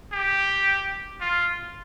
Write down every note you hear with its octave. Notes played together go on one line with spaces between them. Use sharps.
G4
F4